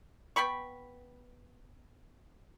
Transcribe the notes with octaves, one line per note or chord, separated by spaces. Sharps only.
B3 G5 B5 C#6